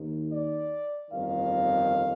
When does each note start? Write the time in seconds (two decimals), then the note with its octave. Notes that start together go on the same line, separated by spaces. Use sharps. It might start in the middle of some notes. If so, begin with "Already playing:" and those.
Already playing: D#2 D#3
0.31 D5
1.10 G1 F2 D#3 F5